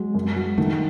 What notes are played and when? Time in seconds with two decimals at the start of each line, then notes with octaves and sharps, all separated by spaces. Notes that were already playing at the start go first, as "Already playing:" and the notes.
Already playing: F#3 G#3
0.15 F#2
0.36 F#3
0.58 D#3 A3